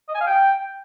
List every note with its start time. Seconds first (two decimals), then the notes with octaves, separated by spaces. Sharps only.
0.09 D#5
0.15 G#5
0.21 F5
0.27 G5